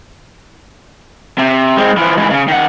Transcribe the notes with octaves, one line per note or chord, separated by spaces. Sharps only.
C3
G#3 C4
E3 F3
G#2 E3
C#3
D#3 F#5